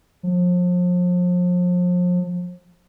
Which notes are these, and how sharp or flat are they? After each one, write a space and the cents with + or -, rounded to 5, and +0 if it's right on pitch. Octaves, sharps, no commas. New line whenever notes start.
F3 +35